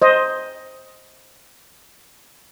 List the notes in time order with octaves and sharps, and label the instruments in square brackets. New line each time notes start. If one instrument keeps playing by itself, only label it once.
[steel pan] C5 D#5